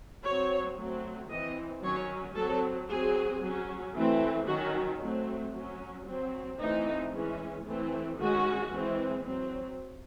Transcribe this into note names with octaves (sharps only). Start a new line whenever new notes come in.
F#3 C4 C#5
F#3 A3 C4
E3 C4 D#5
D#3 F#3 C#4 C#5
F#3 C4 A4
F#3 C4 G#4
F#3 C#4
E3 A3 C4
D#3 F#3 C#4 F#4
F#3 A3 C4
F#3 C#4
F#3 C4
E3 A3 C4 D#4
E3 G#3 C#4
E3 A3 C4
D#3 G#3 C#4 F#4
E3 G#3 C4
F#3 C4